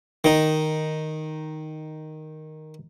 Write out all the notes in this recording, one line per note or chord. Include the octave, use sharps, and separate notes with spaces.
D#3 D#4